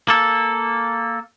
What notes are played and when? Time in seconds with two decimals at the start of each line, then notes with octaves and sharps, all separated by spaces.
0.08 A#3 A4